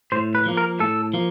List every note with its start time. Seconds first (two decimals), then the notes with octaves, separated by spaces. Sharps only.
0.12 A2 C5
0.35 B4
0.46 F3 A#3
0.57 A#4
0.80 A2 A4
1.14 F3 A#3